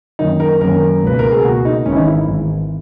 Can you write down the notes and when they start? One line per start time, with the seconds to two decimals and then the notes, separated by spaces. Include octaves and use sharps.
0.19 F#2 D#3 A#3 D#4
0.40 A#4
0.61 F#2 D#3 A#3 A#4
1.03 C#2 B2 A#3 B4
1.19 A#4
1.31 G#4
1.44 C#2 B2 A#3 F#4
1.65 D#4
1.86 G#1 G#2 E3 C#4
1.92 E4
1.96 D#4
2.06 E4
2.27 G#1 G#2 E3